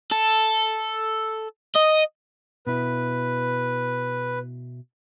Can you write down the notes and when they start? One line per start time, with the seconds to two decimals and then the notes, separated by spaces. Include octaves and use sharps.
0.11 A4
1.75 D#5
2.67 B2 E4 B4